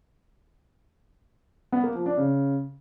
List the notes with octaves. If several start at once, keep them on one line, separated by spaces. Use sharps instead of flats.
B3
A#3
F3
D4
C#3